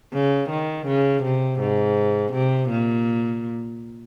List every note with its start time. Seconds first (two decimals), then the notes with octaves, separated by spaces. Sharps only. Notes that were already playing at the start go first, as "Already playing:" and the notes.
0.14 C#3
0.50 D#3
0.87 C#3
1.23 C3
1.60 G#2
2.33 C3
2.70 A#2